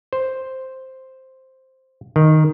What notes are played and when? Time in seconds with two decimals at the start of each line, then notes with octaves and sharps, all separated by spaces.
0.13 C5
2.16 D#3